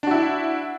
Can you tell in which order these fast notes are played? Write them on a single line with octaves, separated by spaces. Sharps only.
D4 F#4 E4